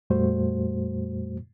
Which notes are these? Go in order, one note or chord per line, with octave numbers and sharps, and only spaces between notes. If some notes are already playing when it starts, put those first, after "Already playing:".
F2 A#2 G3 A3 F#4 C5